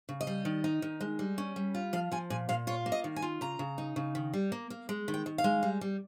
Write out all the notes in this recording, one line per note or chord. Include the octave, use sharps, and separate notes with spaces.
C#3
D#5
G3
D#3
D#4
D#3
G#3
G3
C#4
G3
F4
F3 F5
F3 G#5
A#2 G#5
A#2 F5
F4 C#5
A#3
D#5
D#3
G#5
F4
C#3 A#5
C#3
D#4
C#3
D#3
G3
A#3
A#3
G#3
D#3
G5
D#3
F5
G#3
G3
G3